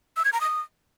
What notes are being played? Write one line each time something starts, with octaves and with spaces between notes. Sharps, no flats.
E6
G#6
A#5
D#6